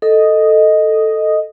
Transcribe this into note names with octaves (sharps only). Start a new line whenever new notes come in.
A4 D#5